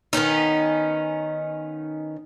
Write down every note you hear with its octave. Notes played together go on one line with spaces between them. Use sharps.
D#3 B3 C#4 D#4